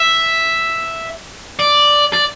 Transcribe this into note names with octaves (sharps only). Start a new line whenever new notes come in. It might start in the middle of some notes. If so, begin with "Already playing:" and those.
Already playing: E5
D5
D5